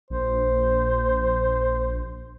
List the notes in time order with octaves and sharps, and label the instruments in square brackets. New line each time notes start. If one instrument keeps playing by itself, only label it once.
[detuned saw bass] A#1 [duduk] C5